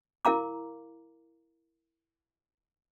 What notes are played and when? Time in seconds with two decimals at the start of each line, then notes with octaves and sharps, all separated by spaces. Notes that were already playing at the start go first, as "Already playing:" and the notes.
0.25 E4 A#4 F5 A#5 D6